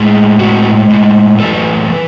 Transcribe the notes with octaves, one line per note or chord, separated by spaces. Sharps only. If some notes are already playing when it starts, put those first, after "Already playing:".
Already playing: A2 G#3
A2 G#3 F#4
A2 G#3
F#2 E3 A3 A4
E3